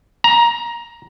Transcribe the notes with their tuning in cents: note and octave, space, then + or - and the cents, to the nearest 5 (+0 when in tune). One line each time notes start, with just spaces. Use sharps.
A#5 +15